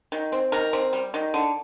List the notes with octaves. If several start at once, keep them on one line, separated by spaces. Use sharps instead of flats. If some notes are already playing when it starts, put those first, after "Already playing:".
D#3
C4
D#3 A#4
C4
G3
D#3
D3